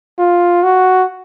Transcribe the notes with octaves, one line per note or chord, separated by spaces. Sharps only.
F4
F#4